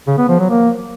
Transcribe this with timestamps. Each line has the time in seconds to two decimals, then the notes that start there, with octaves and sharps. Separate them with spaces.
0.08 C#3
0.18 B3
0.29 F3
0.40 F#3
0.50 A#3